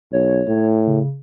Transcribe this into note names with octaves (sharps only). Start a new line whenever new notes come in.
B1 C#5
A2
C#3